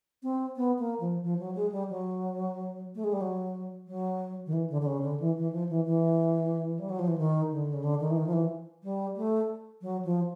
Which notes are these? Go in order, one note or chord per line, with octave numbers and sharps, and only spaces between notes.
C4
B3
A#3
F3
F3
F#3
G#3
G3
F#3
A3
G#3
G3
F#3
F#3
D#3
E3
D3
D3
C#3
D3
E3
E3
F3
E3
E3
G3
F#3
F3
E3
D#3
D3
C#3
D3
D#3
E3
D#3
F3
E3
G3
A3
F#3
F3